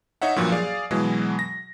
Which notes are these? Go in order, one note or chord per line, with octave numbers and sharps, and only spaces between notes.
D#4 C#5 E5 F#5
G2 A#2 F3 F#3
G#4 D5 F5
B2 E3 F#3 G#3
A#6